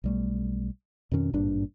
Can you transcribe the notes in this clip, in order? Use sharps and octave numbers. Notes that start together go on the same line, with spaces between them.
B1 G3 A3
F2 B2 D#3 C#4
G#1 G2 A#2 D4